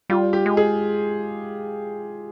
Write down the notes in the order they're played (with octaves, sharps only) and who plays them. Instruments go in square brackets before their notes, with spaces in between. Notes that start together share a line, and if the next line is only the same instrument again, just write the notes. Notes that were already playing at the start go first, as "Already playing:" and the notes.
[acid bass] G3 [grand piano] F4
[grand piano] G4
[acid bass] G#3
[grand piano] G#4